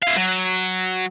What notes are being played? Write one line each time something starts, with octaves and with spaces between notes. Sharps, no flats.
E4 F5
F#3